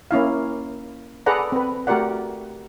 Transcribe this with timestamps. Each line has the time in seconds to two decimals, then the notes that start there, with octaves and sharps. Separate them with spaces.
0.11 A#3 C#4 E4 F5
1.26 G#4 A4 B4 D5 F#5 A#5
1.52 C4 B4
1.87 A3 F#4 G4 A#4 D5 F#5